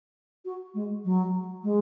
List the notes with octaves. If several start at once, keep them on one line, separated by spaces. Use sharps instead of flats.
F#4
G#3
F#3
G#3